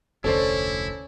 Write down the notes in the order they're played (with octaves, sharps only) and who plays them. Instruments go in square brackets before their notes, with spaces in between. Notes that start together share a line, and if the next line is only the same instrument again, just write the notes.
[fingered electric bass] F1 D2 [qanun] C#4 D5 [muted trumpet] E4 [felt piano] A4 C5